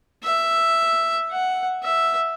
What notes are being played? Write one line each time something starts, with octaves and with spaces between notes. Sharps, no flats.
E5
F#5
E5